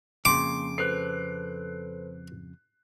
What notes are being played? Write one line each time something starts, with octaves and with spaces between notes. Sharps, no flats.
F2 C#3 A#3 C6 D6
A4 B4 C5 F#6 C7